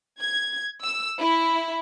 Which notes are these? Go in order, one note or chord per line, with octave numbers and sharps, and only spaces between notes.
G#6
E6
E4